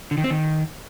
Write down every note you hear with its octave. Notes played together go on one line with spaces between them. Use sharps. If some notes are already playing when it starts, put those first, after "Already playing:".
D3
D#3
C4
D#3